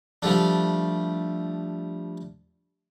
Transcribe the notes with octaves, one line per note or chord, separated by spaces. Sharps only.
F3 G3 A3 D4